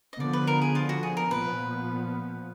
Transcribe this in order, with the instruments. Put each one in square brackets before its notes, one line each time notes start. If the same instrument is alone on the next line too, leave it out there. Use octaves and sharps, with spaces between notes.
[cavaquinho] D#5
[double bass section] D3 F3 B3 [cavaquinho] D5
[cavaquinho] B4
A#4
G#4
F4
F#4
G#4
A#4
[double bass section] A#2 F3 B3 [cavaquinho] B4